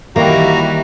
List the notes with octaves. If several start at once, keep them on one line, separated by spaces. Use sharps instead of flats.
D#2 E3 G3 A#3 E4 F#4 A#5